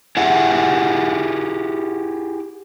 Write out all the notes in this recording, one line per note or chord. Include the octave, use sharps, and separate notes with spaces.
E4 G4 G#4 E5 F#5